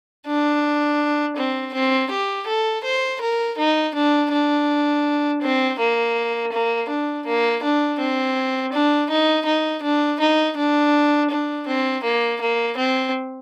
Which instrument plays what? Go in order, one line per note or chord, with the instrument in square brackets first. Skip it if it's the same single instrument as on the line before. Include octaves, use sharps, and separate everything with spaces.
[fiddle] D4
C4
C4
G4
A4
C5
A#4
D#4
D4
D4
C4
A#3
A#3
D4
A#3
D4
C4
D4
D#4
D#4
D4
D#4
D4
D4
C4
A#3
A#3
C4